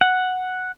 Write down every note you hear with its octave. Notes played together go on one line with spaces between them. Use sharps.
F#5